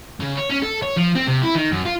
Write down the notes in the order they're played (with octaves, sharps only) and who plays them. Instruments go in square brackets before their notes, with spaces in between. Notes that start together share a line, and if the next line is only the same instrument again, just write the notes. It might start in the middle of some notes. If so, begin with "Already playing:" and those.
[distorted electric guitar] C#3
C#5
C#4
A4
C#5
F3
C4
C3
E4
D#3
F#2
F4